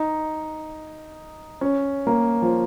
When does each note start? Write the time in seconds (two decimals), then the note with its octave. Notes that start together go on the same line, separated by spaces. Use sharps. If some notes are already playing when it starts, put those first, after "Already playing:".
Already playing: D#4
1.61 C#4
2.07 A#3
2.42 F3